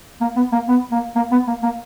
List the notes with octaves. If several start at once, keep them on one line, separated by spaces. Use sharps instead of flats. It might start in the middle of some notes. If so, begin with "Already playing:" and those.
A#3
B3
A#3
B3
A#3
A#3
B3
A#3
A#3